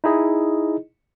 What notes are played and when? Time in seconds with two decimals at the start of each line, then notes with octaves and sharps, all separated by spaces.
0.04 D#4 E4 G#4 D#5